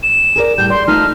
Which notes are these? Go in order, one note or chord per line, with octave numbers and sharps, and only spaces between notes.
E7
G#4 A#4 D5
A2 G3 G6
D5 C6
A3 D#4 F4 F6